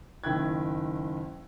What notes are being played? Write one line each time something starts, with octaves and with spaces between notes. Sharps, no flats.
F#1 D#3 E4 G5 F#6 G#6